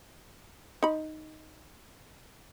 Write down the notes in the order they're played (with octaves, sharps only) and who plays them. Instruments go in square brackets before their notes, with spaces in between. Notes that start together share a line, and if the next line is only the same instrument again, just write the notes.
[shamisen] D#4 B5